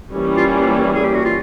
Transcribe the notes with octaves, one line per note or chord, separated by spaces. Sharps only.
E3 G3 A#3 C#4 E4
F4
F4
G#4
G4
F#4
F4